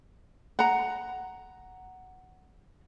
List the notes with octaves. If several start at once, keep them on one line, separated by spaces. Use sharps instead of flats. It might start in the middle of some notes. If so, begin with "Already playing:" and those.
F#5 A#5